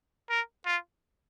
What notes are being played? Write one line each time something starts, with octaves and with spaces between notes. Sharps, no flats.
A#4
F4